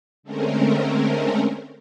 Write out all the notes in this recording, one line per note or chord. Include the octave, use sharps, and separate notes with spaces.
D3 G#3 A3 C4 C#4 A#4